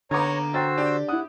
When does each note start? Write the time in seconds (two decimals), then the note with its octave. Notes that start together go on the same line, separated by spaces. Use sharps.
0.11 D3 A#3 B3 D#4 C#5 A#5 D6 G#6
0.54 F#4 C5 G5 E6 A6
0.77 D4 G4
1.09 E4 F#5 D#6